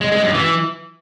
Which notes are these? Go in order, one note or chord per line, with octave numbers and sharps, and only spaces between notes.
G#3
G#3
F#2
E3